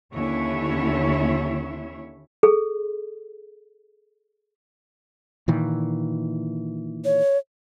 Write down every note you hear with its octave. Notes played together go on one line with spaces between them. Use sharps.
D#2 D3 C#4 E4 C#5 E5
G#4 A4
A#2 D#3 E3
C#5